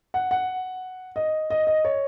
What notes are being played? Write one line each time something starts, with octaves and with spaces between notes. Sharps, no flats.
F#5
F#5
D#5
D#5
D#5
C#5